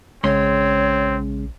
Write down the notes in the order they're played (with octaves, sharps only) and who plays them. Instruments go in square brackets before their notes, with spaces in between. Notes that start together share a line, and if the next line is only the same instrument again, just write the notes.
[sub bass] A#1 [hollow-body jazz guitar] C#3 G#3 C6 [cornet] C4 [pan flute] C#5